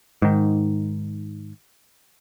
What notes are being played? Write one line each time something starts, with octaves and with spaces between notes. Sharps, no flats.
G#2 D#3